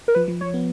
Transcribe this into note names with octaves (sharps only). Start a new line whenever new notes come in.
A#4
F3 B4
F3
F3 C#5
B3